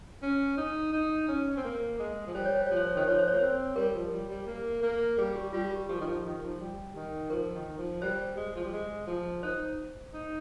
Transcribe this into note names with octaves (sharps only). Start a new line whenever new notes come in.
C#4
D#4
D#4
C#4
C4
A#3
G#3
F3
G3 C5
C#5
C5
F3 C#5
C5
C#5
D#3 C5
F3 C#5
C5
A#3 C#5
C4 C5
G3 A#4
F3
G3
G3
A#3
A#3
G3 G#4
G4
G3 F4
G4
F3 G4
D#3
F3
D#3
F3
G3
D#3
F3 A#4
D#3
F3
G3 C5
G#3
F3
G3
G#3
F3
D#4 C5
D#4